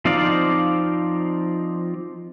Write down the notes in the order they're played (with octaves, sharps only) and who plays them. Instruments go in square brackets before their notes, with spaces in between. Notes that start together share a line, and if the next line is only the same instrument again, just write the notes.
[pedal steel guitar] F3 C4 D#4 D5 F5